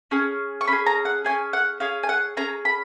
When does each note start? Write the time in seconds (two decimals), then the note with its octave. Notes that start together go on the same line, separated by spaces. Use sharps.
0.11 C#4 G#4
0.61 C#6
0.68 C#4 G#4 B5
0.86 A#5
1.05 F#5
1.25 C#4 G#4 G#5
1.53 F#5
1.80 C#4 G#4 F5
2.03 G#5
2.09 F#5
2.37 C#4 G#4 A#5
2.65 B5